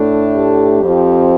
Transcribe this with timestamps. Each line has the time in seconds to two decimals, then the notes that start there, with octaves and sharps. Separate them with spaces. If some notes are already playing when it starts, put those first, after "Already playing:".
Already playing: A2 A3 D4
0.36 G4
0.81 F2 F3 C4